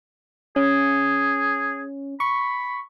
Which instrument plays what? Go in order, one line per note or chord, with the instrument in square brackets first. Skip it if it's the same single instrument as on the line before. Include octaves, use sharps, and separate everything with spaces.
[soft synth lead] C#4 [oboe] G#4
[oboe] B5 [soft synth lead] C#6